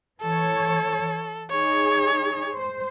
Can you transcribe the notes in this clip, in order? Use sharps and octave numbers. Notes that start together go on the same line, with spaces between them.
E3 A4 C#5
D#4 G#4 C#5
C5